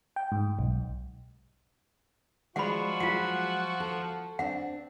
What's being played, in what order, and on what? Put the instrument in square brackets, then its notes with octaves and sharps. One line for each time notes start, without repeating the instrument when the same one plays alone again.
[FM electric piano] G5
G#2
B1
[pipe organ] F3 [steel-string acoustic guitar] G#3 D5 [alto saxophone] F#4 [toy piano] F#5 B5
[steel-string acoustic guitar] F#3 G#3 [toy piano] F4 F#5
[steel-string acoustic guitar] A4
[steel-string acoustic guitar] C4 D4 [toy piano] F#5